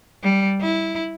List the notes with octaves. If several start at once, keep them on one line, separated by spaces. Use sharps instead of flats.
G3
E4